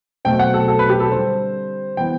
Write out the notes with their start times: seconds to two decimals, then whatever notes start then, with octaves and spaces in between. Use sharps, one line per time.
0.25 B2 F#3 A3 C4 G5
0.39 F#5
0.54 A4
0.68 A4
0.79 B4
0.90 G4
1.00 A4
1.11 D3 G3 C4 C5
1.97 E3 B3 G5